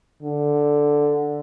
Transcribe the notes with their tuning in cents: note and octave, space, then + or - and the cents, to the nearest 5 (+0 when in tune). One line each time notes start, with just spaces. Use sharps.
D3 +0